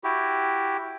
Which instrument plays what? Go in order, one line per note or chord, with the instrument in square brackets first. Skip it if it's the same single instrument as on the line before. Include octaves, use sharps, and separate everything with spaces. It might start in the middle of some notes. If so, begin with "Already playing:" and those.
[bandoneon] E4 F#4 G4